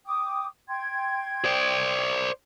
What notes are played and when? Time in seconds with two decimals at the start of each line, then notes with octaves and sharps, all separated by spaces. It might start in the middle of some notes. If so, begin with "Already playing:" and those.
0.06 G5 D6 D#6
0.68 G5 C6 G#6
1.45 C5 D5